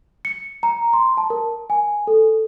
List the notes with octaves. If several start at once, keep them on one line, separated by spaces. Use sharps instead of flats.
C#7
A#5
C6
A5
A#4
G#5
A4